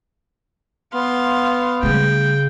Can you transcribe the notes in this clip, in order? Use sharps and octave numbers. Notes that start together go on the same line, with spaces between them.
B3 F5 C6
C#3 G3 A3 G5